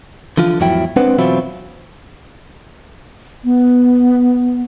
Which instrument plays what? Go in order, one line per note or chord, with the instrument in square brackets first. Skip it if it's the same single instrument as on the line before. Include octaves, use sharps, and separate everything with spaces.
[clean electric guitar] D3 E3 F3 F4
E2 G#2 F3 F#3 E4 G5
G#3 C4 D4 B4 C5 F#5
B2 E3 F#3 C4 E4 F4
[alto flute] B3